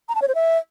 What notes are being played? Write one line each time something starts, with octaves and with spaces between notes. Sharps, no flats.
A#5
A5
C#5
C5
E5